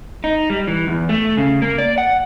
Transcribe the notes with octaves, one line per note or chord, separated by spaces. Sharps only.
D#4
G3
E3
E2
A3
C#3
A#3
D5
F#5